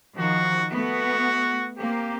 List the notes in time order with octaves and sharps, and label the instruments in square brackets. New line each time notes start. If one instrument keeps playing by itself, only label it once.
[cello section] D#3 F3 [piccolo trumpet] F#4
[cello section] A3 B3 [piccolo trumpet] F#4
[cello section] A#3 C4 [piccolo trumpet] G4